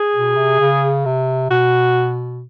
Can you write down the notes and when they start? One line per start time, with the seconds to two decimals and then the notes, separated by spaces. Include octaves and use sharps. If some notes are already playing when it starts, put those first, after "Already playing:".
Already playing: G#4
0.15 B2
0.36 C3
0.60 C#3
1.05 C3
1.50 B2 F#4